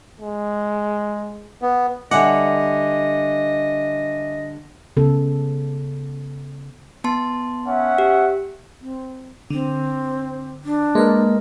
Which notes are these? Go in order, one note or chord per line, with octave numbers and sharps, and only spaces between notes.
G#3
B3
D3 G3 D#5 E5 F#5 G#5 D6
C#3 B3 A4
B3 A5 C6
C#4 E5 F#5
G4
C4
D3 C4
D4
G#3 A#3 A#4 B4